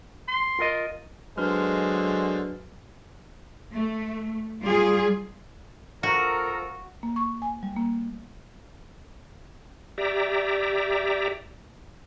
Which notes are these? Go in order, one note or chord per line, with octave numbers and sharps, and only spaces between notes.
C6
F4 A#4 D#5
D3 F#3 G#3 D4 B4 C5 F6
A3
G3 F4 G#4
F3 F#4 A4 A#4
A#3
C#6
G#5
G3
A#3
G4 D5 E5 A#5